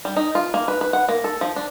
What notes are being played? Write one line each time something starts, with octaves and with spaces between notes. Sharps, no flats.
G3
D#4
F4
A#3
B4
B4
F#5
A#3
A4
F3
D4